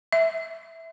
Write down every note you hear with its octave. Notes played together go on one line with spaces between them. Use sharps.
E5